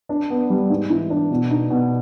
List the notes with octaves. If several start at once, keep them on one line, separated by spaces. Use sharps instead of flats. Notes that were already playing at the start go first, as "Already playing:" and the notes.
D4
B3
G3
G#2
E3
D4
B2
D#4
B2